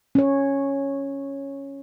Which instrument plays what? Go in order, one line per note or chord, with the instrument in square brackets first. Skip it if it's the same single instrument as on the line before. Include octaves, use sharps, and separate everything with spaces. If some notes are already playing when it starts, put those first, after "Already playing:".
[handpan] C#4 C#5